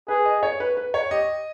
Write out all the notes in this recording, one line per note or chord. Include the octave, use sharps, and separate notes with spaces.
G#4 B4
D#5
C#5
B4
B4
C#5
G4 D#5